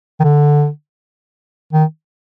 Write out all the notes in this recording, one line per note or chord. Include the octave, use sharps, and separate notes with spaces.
D#3
D3
D#3